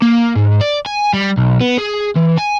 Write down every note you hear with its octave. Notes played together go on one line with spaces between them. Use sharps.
A#3
G#2
D5
G#5
G3
B1
B3
G#4
E3
G#5